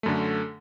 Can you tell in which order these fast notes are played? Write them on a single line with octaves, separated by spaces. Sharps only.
A3 F#2 D3